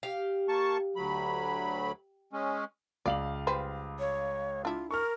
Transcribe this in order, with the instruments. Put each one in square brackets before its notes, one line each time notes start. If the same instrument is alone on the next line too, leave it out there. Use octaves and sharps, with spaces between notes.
[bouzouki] G4 F5
[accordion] A#3 A5 C#6
D2 F#3 B5
G#3 C#4
[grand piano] C#2 F5 F#7 [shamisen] D5
[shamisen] G3 B4 C5
[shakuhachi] C#5
[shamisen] D4 E4 [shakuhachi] F4
[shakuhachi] A#4 [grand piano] C#6 F6